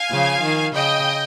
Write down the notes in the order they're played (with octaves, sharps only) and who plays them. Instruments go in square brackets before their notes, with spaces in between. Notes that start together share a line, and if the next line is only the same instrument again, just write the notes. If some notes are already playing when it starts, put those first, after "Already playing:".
Already playing: [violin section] F5 G#5
[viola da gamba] C#3 F3
D#3
[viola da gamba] C#3 [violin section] D#5 G5